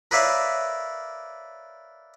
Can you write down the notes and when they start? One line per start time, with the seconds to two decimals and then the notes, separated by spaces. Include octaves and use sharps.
0.11 A#4 B4 C#5 D5 E5 F5